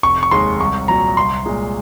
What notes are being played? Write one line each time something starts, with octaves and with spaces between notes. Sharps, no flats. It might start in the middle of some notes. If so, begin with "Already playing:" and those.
F1 C#6
C#6
D#2 D#3 G#3 C6
C2 C#6
A#2 F#3 A#5
C2 C6
A#2 G#3